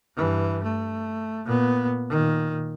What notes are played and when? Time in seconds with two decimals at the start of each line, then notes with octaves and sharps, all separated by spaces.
0.16 G2 E3
0.63 A3
1.46 A#2 B3
2.09 A#2 D#3